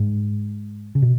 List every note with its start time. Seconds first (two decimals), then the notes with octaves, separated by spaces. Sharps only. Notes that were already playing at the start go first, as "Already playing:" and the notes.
Already playing: G#2
0.95 C#3
1.02 B2